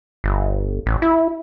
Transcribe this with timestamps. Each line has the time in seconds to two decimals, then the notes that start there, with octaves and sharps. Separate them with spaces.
0.24 G1
0.86 A1
1.02 E4